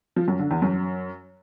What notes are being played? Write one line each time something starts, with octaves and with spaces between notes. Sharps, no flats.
F3
F#2
D3
E2
F#2